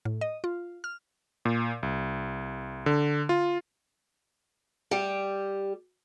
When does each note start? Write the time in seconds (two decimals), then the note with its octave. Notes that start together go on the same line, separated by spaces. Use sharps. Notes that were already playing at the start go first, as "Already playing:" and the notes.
0.05 A2
0.21 D#5
0.44 F4
0.84 F6
1.45 A#2
1.83 C2
2.86 D3
3.29 F4
4.91 G3 G4